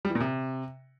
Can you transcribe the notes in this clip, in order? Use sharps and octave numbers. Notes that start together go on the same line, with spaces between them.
G3
E3
A#2
C3